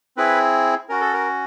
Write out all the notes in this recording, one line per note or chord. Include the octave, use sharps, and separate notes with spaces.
C4 E4 G#4 B4
C#4 F#4 A#4
A4
A#4